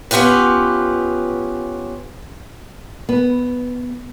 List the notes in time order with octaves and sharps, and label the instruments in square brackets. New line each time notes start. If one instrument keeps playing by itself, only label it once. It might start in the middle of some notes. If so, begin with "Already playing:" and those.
[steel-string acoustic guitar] B3 C#4 F4 G4 B4
[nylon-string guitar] B3